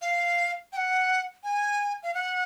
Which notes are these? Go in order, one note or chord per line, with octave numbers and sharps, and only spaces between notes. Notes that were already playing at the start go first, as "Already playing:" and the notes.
F5
G5
F#5
G#5
F5
F#5